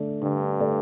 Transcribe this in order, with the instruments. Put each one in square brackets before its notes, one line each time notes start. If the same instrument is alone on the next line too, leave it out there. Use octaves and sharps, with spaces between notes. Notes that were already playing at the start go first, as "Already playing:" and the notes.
Already playing: [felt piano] D3 A3 D4 A4 D5
[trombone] G2 [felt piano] D3
[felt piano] A3 D4 A4 D5